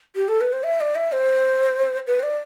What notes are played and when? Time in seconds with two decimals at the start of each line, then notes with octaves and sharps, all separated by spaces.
0.16 G4
0.28 A4
0.41 B4
0.53 C5
0.64 E5
0.81 D5
0.95 E5
1.12 C5
2.07 B4
2.20 C5
2.23 D5